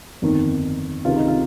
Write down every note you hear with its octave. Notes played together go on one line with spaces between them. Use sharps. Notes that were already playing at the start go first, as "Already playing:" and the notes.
G1 F2 D#3
C#2 C3 D#3 F4
D#4
F4